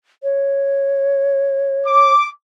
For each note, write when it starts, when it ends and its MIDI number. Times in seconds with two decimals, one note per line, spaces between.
0.23 2.13 73
1.86 2.28 86